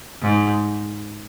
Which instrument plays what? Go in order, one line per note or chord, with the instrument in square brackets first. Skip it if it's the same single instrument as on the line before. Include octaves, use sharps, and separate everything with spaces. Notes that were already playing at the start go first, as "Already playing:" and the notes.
[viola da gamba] G#2